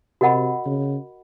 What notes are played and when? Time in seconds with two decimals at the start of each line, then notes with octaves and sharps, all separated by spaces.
0.21 C3 F#4 A#4 D#5 F#5 B5
0.66 C#3